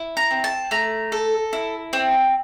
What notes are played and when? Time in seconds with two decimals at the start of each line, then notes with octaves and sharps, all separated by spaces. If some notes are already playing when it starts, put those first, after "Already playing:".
Already playing: E4
0.17 A#5
0.31 C4
0.44 A5
0.71 A3 A#5
1.12 A4
1.53 E4
1.93 C4